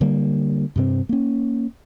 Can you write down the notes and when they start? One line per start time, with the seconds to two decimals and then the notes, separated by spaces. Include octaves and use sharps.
0.01 D3 G3 A#3
0.76 G2 C3 C4
1.09 A#3 C#4